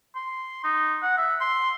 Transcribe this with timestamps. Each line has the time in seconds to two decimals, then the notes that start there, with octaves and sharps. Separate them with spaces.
0.15 C6
0.64 D#4
1.02 F#5
1.17 E5
1.41 C6